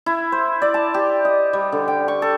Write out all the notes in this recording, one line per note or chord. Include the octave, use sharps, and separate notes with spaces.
E4
C5
D5
A5
G4
D#5
G3
D3
G5
C#6
A4